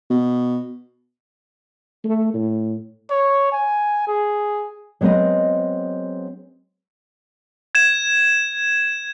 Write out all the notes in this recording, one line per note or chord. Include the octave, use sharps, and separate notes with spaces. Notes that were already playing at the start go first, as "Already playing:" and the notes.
B2
A3
A2
C#5
G#5
G#4
F#3 G#3 B3 C4 B4 D#5
G#6 E7